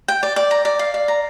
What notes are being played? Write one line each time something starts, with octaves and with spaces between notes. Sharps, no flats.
G5
D5
D5
A#5
D5
F5
D5
A#5